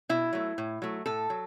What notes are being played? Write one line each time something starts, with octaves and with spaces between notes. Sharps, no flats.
B2 E4
F#3 A3
A2
F#3 A3
A2 A4
F#3